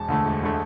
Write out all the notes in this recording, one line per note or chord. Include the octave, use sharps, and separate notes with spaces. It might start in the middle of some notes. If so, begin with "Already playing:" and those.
Already playing: E1 A5
D2 D3 A3
E1
D3 A3